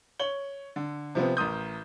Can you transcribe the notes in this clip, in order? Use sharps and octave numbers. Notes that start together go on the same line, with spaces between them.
C#5 F#7 G7
D3
C3 F3 B3 C4
A1 A#4 D#6 G6